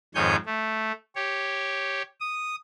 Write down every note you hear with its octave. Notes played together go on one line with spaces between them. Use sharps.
F2 G#2 D#3 C#5 G#5 G6
A3
G4 C#5
D#6